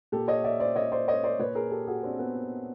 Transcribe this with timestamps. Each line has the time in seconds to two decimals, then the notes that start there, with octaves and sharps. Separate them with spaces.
0.12 A#2 G4 A4
0.28 C#5 D#5
0.44 D5 E5
0.60 C5 D5
0.76 C#5 D#5
0.92 C5 D5
1.08 C#5 D#5
1.23 C5 D5
1.39 A#2 B4 C#5
1.55 G#4 A#4
1.71 G4 A4
1.87 F#4 G#4
2.03 C4 D4
2.19 B3